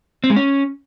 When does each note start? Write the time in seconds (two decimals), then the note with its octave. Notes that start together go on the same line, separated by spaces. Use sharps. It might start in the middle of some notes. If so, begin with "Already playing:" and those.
0.24 C4
0.30 G#3
0.36 C#4